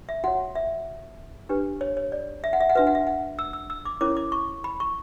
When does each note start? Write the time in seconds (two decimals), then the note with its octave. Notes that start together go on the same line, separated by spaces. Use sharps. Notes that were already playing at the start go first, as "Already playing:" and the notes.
0.09 E5
0.24 F#4 C#5 F#5
0.55 E5
1.49 D4 G4 B4
1.81 C#5
1.97 C#5
2.12 D5
2.44 E5
2.53 F#5
2.61 E5
2.70 F#5
2.75 D4 F#4 B4 E5
2.87 F#5
2.95 E5
3.07 F#5
3.39 E6
3.53 E6
3.70 E6
3.85 D6
4.01 C#4 E4 A#4 C#5 D6
4.17 D6
4.32 C#6
4.64 B5
4.80 C#6